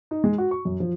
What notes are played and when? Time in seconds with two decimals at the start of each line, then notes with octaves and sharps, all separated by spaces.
0.11 D#4
0.24 G#3
0.38 F#4
0.51 C#6
0.65 F#2
0.80 F3